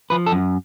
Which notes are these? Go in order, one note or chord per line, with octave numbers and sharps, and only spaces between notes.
F3 B4
A4
F#2